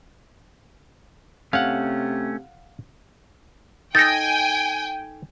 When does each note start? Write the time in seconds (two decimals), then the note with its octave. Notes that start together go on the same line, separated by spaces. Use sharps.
1.53 C3 A3 C#4 F5 F#5
3.95 D#4 A4 G5 G#5 A6 A#6